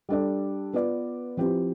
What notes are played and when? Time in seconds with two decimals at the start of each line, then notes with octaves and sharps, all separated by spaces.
0.09 G3 D4 A4 D5
0.74 B3 F4 B4 D5
1.37 F3 C4 E4 G4 B4